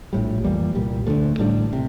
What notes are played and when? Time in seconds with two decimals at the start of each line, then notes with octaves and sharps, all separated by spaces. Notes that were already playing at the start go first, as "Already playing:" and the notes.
0.13 A#1 A2 G3
0.44 F2 E3 G3 A#3
0.75 C2 A#2 G3
1.07 D2 D3 F3 A3
1.38 A1 A2 G3 D4
1.73 C3